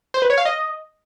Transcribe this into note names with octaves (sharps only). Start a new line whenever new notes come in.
C5
B4
C#5
F5
D#5